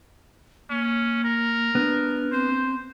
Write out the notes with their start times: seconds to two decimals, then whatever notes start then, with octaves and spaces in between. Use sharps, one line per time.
0.70 A#3 C#4
1.24 A#4
1.75 B3 D4
2.32 C4 C5